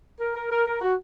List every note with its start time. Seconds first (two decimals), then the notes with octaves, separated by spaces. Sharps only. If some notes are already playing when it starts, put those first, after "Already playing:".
0.20 A#4
0.36 A#4
0.51 A#4
0.66 A#4
0.81 F#4